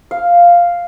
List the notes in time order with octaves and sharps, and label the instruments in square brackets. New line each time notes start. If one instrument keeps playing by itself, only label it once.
[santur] F5